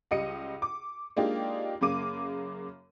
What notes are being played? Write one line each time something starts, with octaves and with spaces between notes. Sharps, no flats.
C#2 G3 D#5 C#7 D#7
D6
G#3 A#3 D4 D#4 F4 G4
F#2 C#3 A#3 D6 D#7